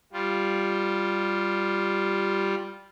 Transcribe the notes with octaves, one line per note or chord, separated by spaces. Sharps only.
G3 F4